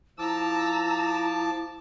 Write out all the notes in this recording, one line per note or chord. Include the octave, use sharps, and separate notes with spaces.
F3 E4 A5 A#5 D6 E6